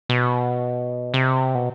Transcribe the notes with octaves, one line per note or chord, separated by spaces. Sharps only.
B2
C3
B2